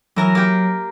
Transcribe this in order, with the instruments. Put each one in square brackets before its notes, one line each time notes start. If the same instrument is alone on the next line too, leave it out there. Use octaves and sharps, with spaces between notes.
[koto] E3 A#4 A#5 [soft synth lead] F#3
[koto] A#3 G4